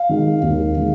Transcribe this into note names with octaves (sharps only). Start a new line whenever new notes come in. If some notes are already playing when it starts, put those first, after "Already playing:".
Already playing: F5
D#3 G#3
D#2
D#3 G#3